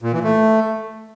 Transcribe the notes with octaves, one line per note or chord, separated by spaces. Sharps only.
A#2
E3
A3